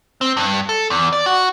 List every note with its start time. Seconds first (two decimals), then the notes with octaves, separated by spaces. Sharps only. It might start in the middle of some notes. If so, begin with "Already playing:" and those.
0.21 C4
0.37 G2
0.69 A4
0.90 E2
1.12 D5
1.26 F#4